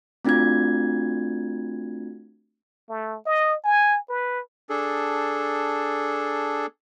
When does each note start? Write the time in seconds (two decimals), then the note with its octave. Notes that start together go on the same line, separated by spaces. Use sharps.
0.25 A3 C4 D4 F4 F#4 G#6
2.90 A3
3.26 D#5
3.64 G#5
4.09 B4
4.70 D4 G#4 A4